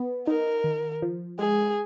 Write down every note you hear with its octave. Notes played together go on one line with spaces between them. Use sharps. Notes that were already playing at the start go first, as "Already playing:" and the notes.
Already playing: B3
D#4 A#4
D#3
F3
G#3 G#4